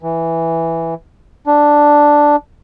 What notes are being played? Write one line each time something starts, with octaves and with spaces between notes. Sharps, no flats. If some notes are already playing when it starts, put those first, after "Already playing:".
E3
D4